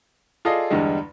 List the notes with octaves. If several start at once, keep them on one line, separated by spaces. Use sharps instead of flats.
F4 G#4 A4 D5 D#5 F5
E2 G2 D3 G3 G#3